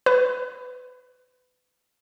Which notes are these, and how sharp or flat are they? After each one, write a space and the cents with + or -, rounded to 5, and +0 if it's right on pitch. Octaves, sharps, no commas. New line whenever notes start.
B4 +30